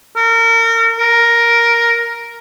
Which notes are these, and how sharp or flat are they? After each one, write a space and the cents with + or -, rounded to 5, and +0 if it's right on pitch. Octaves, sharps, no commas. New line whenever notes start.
A#4 -30
A#4 +5